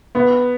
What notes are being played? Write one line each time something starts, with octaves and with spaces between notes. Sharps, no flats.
B3